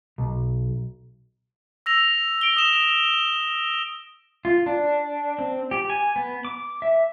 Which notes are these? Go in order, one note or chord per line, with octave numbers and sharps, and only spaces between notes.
B1
E6 A#6 F7
D7 G7
D#6 E7
F4
D4
C4
G4
G#5
B3
D6
E5